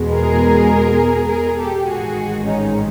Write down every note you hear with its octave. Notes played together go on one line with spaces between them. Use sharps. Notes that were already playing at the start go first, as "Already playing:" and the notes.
Already playing: E2 B2 G#3
G#4 A#4
G#4 A#4
G4 A4
A1 G#2 D#3 G#3 F#4 G#4
C#4 D#4